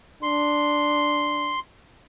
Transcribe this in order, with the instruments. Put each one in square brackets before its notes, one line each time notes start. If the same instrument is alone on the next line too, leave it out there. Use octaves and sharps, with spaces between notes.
[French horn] D4 [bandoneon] C6